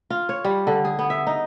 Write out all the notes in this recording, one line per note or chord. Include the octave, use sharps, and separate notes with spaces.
F4
C#5
G3
D3
G#4
B3
E5
D#4